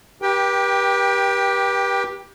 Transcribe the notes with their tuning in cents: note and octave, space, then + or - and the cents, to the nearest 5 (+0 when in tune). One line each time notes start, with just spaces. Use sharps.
G4 +0 B4 -40 G5 +15